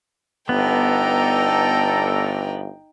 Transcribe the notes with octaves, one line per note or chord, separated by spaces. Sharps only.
G1 B3 D#4 A4 D5 G5 A#5